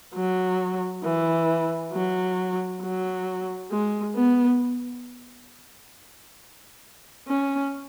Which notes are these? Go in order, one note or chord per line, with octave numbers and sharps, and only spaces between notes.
F#3
E3
F#3
F#3
G#3
B3
C#4